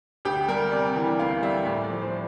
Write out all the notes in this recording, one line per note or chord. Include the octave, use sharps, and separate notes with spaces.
D2 G4
G3 A#4
C3 D5
E3
D2 F5
G3 E5
A2 D5
D5
F3
C5